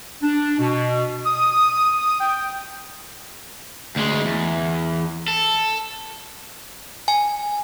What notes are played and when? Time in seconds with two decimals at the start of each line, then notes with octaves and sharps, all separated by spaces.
0.23 D4
0.59 B2
1.26 D#6
2.20 G5
3.96 D2 G#3
4.25 E2
5.28 A4
7.08 G#5